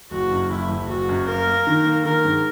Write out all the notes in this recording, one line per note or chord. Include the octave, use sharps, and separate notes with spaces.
F#1 F#4
F#2
F#1 E4
F#1
F#1 F#4
F#2
A#3 A#4
A#3
D#3
A#3
D#3 A#4
G#2